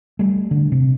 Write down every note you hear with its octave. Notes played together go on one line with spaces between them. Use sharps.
G3 A3
D3
C3